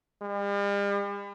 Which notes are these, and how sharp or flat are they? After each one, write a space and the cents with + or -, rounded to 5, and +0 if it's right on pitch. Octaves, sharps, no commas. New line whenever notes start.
G3 +45